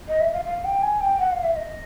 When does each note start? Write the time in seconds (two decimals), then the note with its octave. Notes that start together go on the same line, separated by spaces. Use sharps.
0.08 D#5
0.21 E5
0.34 F5
0.45 F5
0.65 G5
0.82 G#5
1.00 G5
1.19 F#5
1.32 F5
1.43 E5
1.56 D#5